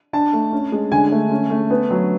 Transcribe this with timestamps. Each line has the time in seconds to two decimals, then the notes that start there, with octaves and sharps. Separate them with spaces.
0.13 D4 A5
0.33 A3
0.52 C#4
0.72 G#3
0.92 D3 G#5
1.11 A3
1.31 C#4
1.50 A3
1.70 B3
1.90 F#3